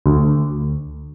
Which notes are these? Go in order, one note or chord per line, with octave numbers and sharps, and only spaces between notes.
D2